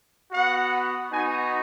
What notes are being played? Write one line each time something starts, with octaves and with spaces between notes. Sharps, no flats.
B3 F#4 F#5
B3 D#4 F#4 G#5